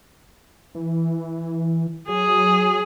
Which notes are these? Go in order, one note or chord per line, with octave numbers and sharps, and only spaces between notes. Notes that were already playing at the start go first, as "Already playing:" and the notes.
E3
F#3 G#4